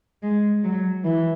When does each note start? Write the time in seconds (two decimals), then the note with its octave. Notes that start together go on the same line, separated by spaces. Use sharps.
0.23 G#3
0.63 F#3
1.04 E3